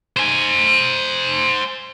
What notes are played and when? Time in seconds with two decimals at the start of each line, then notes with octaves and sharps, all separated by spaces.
0.17 C5 G#5